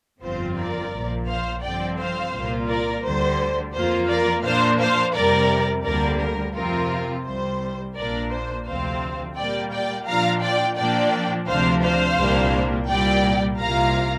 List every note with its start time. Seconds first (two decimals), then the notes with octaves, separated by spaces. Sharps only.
0.23 G1 F2 F3 C4 F4 C5
0.58 A#4 D5
0.94 A#1 A#2 F3
1.28 C5 F5
1.63 G2 D3 F3 C4 D5 G5
1.99 C5 F5
2.33 C2 A#2 A#3 F4
2.69 A#4 D5
3.04 D2 D3 G3 C5
3.74 F2 F3 A#3 F4 C5
4.10 A#4 D5
4.45 A#2 F3 A#3 D4 C5 F5
4.80 C5 F5
5.15 F2 C3 G3 A#4 D5
5.85 D2 D3 G3 A#3 A#4 D5
6.21 A#4
6.56 F2 C3 F3 C4 F4 A#4
7.26 C2 C3 G3 C5
7.96 A#1 A#2 A#3 D4 A#4 D5
8.32 C5
8.67 D2 C3 F3 C4 C5 F5
9.37 A#2 G3 A#3 D5 G5
9.72 D5 G5
10.07 A#2 F3 D4 F4 F5 A#5
10.42 D5 G5
10.77 A#2 F3 A#3 D4 D5 G5
11.47 D2 C3 F3 D4 C5 F5
11.83 C5 F5
12.18 C2 A#2 G3 A#3 D4
12.88 C2 A#2 G3 D5 G5
13.59 C2 C3 A#3 F4 F5 A#5